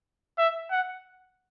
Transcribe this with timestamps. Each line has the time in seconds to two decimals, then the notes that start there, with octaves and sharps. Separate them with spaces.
0.38 E5
0.71 F#5